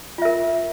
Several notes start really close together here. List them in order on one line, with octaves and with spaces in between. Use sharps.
F4 E5 A#4